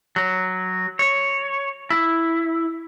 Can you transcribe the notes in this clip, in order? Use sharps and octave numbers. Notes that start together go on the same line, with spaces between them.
F#3
C#5
E4